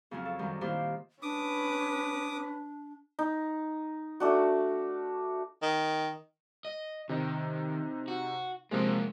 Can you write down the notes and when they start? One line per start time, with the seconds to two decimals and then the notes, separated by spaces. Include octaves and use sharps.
0.11 F2 C#3 F#3 C#4 F4
0.25 A4
0.39 F#2 D#3 G3
0.61 A#2 D#3 E4 F4 G4 C5
1.22 C#4 D4 B4 D6 D#6
3.19 D#4
4.20 A3 D4 F#4
5.62 D#3
6.65 D#5
7.09 C3 D#3 D#4
8.08 F#4
8.71 C3 F3 G#3 A#3 C#4